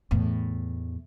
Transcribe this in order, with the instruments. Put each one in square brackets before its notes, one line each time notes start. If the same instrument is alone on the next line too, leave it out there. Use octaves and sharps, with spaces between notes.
[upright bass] E2 A2